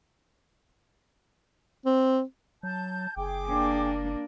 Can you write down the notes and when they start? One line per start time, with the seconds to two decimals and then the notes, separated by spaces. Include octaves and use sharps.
1.86 C4
2.63 F#3 A5 G6
3.17 F#1 G#4 G5 D6
3.48 A#3 D4